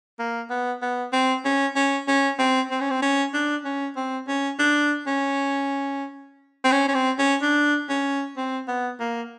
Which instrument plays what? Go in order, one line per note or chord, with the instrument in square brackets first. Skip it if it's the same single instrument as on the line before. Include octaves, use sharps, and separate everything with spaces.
[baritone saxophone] A#3
B3
B3
C4
C#4
C#4
C#4
C4
C4
C#4
C4
C#4
D4
C#4
C4
C#4
D4
C#4
C4
C#4
C#4
C4
C#4
D4
C#4
C4
B3
A#3